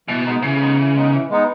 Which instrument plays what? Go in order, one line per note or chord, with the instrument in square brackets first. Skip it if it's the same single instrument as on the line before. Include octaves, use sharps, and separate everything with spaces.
[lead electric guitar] B2 [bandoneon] E3
[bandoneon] G#3 B3 D#4
[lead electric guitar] C#3 [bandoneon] E3
[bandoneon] G#3 B3 D#4
E3
G#3 B3 D#4
E3
G#3 B3 D#4